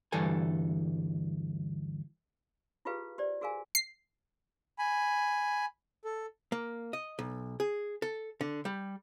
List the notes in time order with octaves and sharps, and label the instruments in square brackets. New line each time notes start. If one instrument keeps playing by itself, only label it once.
[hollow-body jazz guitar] D2 G2 E3 G3 A4 G#5
[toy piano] E4 F4 G4 G#4 B4 F5
G4 C5 D5
F#4 G#4 A#4 F5 G#5
[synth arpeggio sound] C7
[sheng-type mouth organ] G#5 B5
A4
[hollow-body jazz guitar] A#3
D#5
B1
G#4
A4
D3
G3